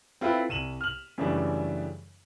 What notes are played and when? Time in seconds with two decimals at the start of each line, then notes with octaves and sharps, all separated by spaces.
0.21 C4 E4 F4 A4 B4
0.49 C2 D#7 E7 F#7
0.81 F6 F#7
1.18 F#2 C#3 E3 G3 A3 D4